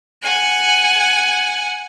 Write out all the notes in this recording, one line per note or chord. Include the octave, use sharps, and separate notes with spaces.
F#5 G#5